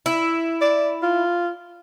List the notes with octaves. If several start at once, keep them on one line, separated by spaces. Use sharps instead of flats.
E4
D5
F4